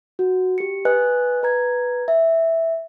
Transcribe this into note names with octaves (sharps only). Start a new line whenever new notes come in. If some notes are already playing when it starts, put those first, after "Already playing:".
F#4
G4 C#7
B4 D#5 G#5 F#6
B4 A#5 G#6
E5